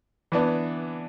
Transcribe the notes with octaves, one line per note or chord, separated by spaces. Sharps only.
E3 B3 D4